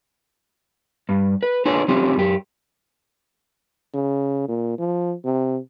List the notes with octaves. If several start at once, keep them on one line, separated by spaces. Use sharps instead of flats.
G2
B4
D4 F4 G#4 B4 C#5
F3 C4 C#4 F4 G4
F#2 G4
C#3
A#2
F3
C3